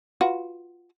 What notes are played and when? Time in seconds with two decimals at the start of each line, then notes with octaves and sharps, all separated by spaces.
0.21 F4 F#4 B4